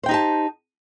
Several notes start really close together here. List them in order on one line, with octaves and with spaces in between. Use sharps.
C5 G5 D#4 G4 A5